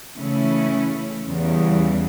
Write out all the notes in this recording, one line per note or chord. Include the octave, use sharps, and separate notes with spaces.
C#3 E3 A3 C#4 E4
E2 C#3 E3 G3